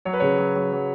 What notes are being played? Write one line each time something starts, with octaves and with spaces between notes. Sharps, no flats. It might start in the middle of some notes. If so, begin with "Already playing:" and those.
F#3 C#5
B4
C#3 C#5
F#3
F#3
F#3